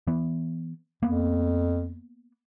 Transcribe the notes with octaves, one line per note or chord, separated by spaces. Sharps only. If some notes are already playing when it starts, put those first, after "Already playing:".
E3 B3
F2 A#3 B3